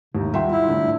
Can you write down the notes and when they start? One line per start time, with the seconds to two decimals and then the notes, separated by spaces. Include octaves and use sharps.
0.15 D#2 C3 D#4
0.34 G3 F4 E5 F#5 G5 C6
0.51 E4
0.68 A2 D3